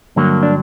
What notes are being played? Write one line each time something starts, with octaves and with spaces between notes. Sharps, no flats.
G2 D3 F#3 A#3
D4